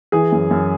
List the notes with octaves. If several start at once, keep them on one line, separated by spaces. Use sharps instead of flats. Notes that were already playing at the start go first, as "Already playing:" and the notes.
E3 G#4
F#2
F#2